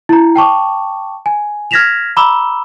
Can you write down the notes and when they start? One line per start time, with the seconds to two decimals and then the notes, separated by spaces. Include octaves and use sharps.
0.09 E4 A#5
0.36 G5 A5 C#6 D6
1.26 G#5
1.71 F6 G#6 A#6 B6 E7 F7
2.17 A#5 B5 D6 E6 E7 G7